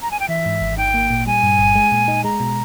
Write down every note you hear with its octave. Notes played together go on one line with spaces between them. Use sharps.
A#5
G#5
G5
E3 E5
G#2
G#1
D#4 G5
A#3
A#2
G3 G#5
G2
G1
G#3
A#2
D#4
G#3 A#5
B2